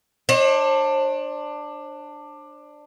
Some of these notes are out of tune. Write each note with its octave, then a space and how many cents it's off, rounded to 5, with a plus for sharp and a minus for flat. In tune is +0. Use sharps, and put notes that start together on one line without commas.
D4 +15 C5 +45 D#5 +0